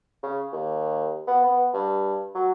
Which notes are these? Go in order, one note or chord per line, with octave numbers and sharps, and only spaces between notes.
C#3
D#2
B3
B3
G2
F#3